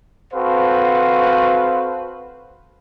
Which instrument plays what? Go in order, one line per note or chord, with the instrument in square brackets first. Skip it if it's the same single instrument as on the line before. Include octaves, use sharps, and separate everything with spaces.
[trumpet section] C4 F#4 A4 B4 C5 F5